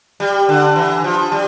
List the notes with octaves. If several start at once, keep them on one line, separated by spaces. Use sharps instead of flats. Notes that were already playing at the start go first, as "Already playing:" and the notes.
G3
D3
E3
F3
G3